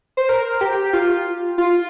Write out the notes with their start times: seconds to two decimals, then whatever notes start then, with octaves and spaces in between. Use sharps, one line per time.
0.17 C5
0.29 A#4
0.61 G4
0.93 F4
1.58 F4